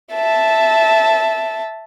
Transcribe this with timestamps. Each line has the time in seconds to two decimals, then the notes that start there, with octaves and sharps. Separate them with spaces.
0.13 E5 A5